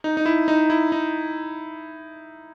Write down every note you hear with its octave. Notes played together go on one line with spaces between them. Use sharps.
D#4
D#4
E4
D#4
E4
D#4